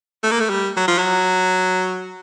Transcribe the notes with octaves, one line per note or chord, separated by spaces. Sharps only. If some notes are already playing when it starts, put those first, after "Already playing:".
A3
A#3
A3
G3
F#3
F3
F#3